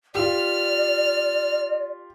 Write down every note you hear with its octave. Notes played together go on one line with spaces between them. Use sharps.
F4 G4 D5 F6